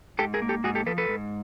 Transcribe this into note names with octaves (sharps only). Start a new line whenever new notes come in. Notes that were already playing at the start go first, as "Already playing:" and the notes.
G#2 G4 A4
G#4 A#4
A#3
G4 A4
G#2 F#4 G#4
G4 A4
F3 A4 B4
A4 B4
G#2